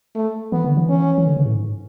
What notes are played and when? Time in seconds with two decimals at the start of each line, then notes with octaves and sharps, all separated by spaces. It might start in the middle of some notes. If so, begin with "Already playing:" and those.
0.15 A3
0.52 E3 B3
0.64 D3
0.77 E3
0.89 C#4
1.18 E3
1.27 D3
1.37 C#3
1.46 A2
1.55 G#2